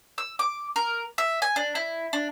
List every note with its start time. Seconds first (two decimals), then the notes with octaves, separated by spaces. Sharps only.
0.18 E6
0.39 D6
0.76 A#4
1.18 E5
1.42 G#5
1.56 D4
1.75 E4
2.13 D4